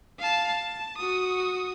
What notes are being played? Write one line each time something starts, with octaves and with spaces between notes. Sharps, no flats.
F5 A5
A5
F#4 D#6